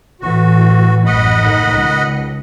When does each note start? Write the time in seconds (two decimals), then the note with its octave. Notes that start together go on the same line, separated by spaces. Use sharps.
0.21 A2 E3 F#4
1.06 A1 F#2 D#5 F#5 B5
1.37 A2 D#3
1.72 C#2